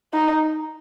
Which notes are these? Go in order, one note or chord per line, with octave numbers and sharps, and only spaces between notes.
D#4